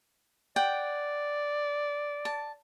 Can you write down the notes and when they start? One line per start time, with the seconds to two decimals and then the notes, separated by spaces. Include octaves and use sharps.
0.56 D5 F#5 G5
2.25 A5